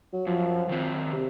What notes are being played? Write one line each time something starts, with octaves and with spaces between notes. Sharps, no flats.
F#3
F#2 F3
D#3 F#3 C4
C3